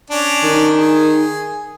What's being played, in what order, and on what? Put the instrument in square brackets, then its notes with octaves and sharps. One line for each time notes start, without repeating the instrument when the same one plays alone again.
[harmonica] C#4 D4
[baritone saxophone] D#3
[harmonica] G#4